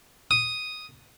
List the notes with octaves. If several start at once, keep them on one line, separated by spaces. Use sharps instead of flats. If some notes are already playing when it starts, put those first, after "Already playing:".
D#6